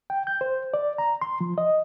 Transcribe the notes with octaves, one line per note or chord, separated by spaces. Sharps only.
G5
G6
C5
D5
A#5
C6
F3
D#5